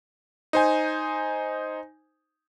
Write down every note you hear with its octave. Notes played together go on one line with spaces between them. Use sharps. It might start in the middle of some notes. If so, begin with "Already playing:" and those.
D#4 C5 G#5